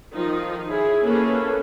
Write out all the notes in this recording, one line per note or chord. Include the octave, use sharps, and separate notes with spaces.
D#3 F3 D#4 F4
E4 G#4 C#5
A#3 C#4 G#4 A4 B4